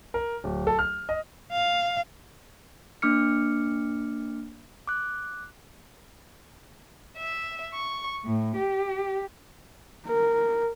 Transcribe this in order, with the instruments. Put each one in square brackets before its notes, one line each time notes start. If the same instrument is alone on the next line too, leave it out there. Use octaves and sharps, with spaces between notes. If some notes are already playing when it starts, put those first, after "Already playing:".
[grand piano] A#4
D1
A4
F6
D#5
[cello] F5
[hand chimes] A#3 D4 D6 F6 C#7
D6 F#6
[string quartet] E5
C#6
A2
G4
[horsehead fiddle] A#4